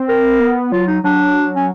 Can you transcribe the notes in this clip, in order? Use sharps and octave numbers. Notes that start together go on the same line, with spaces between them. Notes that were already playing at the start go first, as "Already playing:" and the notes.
Already playing: C4
A#4
B3
F#3 F4
D#4
F#3 D4
C#4